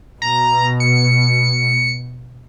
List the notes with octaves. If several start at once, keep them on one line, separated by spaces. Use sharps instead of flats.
B2 A#5
C#7